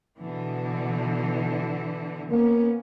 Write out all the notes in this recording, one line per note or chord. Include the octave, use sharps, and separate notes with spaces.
B2 D3 E3
A#3 B3 C#4